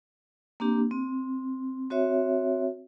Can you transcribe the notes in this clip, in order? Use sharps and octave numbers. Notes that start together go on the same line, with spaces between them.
A#3 C4 D4 G4
C4
C4 F#4 C#5 E5